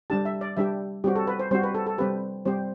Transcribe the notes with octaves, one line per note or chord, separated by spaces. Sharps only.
G3 D4 G4 A5
E5
D5
G3 D4 G4 E5
G3 C4 F#4 G4
A4
B4
C5
G3 C4 F#4 C5
B4
A4
A4
G3 C4 G4 B4
G3 C4 G4 C5